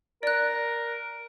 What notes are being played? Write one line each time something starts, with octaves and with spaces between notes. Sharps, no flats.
A#4 D5 F#6